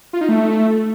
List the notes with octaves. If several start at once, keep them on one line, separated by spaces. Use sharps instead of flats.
F4
D#4
A3